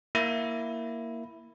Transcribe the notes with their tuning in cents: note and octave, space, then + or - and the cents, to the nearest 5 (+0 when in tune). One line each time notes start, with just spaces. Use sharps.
A#3 +0 E4 +0